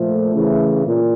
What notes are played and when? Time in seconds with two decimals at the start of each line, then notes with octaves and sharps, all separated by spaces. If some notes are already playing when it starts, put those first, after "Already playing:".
Already playing: A#2 F3 A3
0.34 C#3 E3
0.85 A#2